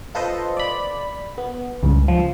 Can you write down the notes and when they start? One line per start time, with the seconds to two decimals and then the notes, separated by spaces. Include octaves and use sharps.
0.15 F4 A4 B4 C5 D#5
0.57 D5 B5
1.38 B3
1.83 C#2 G2
2.08 F3